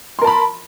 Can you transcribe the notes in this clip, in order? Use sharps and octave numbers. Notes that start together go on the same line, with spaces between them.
A#4 A5 B5 C6